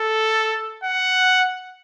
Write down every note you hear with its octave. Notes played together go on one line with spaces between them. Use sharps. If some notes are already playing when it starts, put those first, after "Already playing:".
Already playing: A4
F#5